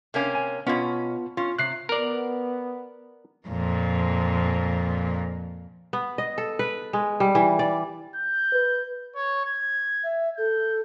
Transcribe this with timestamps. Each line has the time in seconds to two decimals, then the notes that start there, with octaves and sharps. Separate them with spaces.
0.14 C3 A#3 C#4
0.35 G#5
0.67 B2 B3 C#4 F4
1.37 C#4 F4
1.59 C3 F#6 C7
1.89 B3 A#4 D5
3.48 F2 A#2
5.93 B3
6.18 D#5
6.38 A4
6.59 B4
6.93 G#3
7.20 G3
7.35 E3
7.59 D5
8.16 G6
8.53 B4
9.15 C#5
9.45 G#6
10.03 E5
10.38 A4 G6